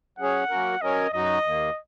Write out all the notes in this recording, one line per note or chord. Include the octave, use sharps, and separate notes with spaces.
F#3 C#4 G#4 C#5 F#5
F#3 A#3 C#4 F#4 A#4
F#3 C#4 A#4 C#5 D#5
F#2 F#3 D#4 F#4 D#5
D#2 D#3 A#3